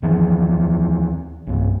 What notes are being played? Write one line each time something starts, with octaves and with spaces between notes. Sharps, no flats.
D#2 E3 F3
B1 G2